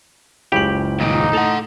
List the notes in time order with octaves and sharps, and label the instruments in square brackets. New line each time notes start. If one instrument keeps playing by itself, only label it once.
[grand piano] F#1 C#2 F#7 [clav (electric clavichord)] C#3 G4 G5
[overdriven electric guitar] D#2 A#2 [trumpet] D#4
[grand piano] A2 A5 F7 [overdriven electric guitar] A4 F#5